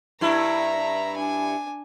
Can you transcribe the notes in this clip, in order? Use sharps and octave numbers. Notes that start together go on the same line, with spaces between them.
G2 E4 E5 A#5
D4 G#5